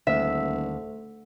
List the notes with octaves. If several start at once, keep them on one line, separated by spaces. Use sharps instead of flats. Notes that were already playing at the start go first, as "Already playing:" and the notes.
D#1 D2 E5